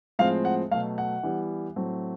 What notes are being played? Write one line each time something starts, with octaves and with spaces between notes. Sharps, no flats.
A2 F3 G#3 C4 F5
F#5
B2 F#3 A3 F5
F#5
E3 G3 B3
A2 F#3 A3 C4